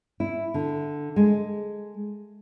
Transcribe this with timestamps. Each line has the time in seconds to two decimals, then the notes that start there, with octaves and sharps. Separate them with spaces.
0.20 E4
0.54 D3
1.16 G#3